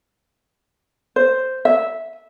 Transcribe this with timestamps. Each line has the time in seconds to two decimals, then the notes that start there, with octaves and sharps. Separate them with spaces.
1.16 C5
1.65 E5